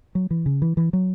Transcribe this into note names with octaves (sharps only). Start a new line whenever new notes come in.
F#3
E3
C#3
E3
E3
F#3